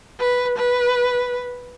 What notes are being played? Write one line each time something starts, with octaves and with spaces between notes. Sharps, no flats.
B4
B4